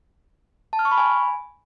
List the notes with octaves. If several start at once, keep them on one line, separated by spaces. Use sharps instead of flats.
A5
F6
C#6
B5
G#5